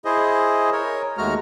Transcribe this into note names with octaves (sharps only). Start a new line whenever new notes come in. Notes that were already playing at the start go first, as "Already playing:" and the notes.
E4 G#4 C5 D#5
A#4 C#5
D#2 G#3 A3 F#4 A#5 F6